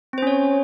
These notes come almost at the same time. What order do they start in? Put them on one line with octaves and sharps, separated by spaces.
C4 C5 C#4 C#5